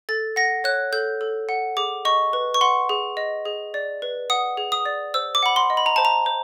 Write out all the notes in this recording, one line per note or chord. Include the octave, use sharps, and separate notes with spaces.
A4 A6
F#5 A#6
C#5 F#6
A4 G6
A4
F#5
G#4 D6
D#5 C#6
B4
C#6
F#5 C6
G#4
D#5
G#4
D5
B4
F#5 D#6
G#4
D#6
D5
C5 E6
D6
F#5 B5
C6
D#5
B5
A#5
C5 A5
A#5
C5